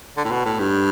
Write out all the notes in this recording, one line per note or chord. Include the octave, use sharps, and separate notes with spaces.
D3
A2
B2
A2
G2